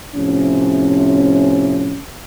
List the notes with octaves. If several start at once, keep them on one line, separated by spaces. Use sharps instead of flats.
A2 C3 F3 C#4